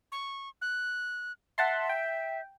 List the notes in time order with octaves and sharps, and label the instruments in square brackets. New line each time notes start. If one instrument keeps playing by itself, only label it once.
[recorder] C#6
F#6
[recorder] E5 [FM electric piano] F#5 A5 C6
[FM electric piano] G5